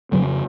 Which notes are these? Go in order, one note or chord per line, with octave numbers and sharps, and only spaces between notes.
F2 C#3 F#3